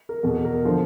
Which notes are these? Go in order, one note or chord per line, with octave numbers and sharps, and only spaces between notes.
A#4
E2 B2 A4
A#4
D3 F3 C5